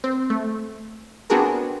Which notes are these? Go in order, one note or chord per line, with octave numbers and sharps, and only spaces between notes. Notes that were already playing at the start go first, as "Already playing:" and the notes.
C4
A3
B3 C4 D4 F#4 G#4 A#4